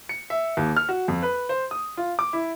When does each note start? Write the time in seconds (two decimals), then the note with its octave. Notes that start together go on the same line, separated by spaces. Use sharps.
0.09 C#7
0.30 E5
0.57 D#2
0.76 F6
0.89 F#4
1.08 F2
1.22 B4
1.49 C5
1.71 D#6
1.97 F4
2.19 D6
2.33 E4